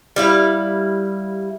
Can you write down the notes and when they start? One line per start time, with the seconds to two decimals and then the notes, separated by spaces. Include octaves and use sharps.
0.16 G3 E4 F5